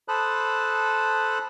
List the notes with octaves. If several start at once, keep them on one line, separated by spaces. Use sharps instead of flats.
A4 C5 A5 B5 D#6 F#6